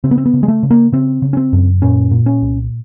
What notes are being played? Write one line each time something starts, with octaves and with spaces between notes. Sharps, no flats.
C#3 C4
B3
C4
B3
C#3
G#3
A3
C#3
A#3
C#3 C4
C#3
C#4
C4
F#2
A#2 C#4
A#2
C#4
C2